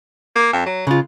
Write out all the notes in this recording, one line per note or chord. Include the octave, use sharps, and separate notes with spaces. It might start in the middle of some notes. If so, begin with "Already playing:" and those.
A#3
F2
F#3
C#3 G#3 F4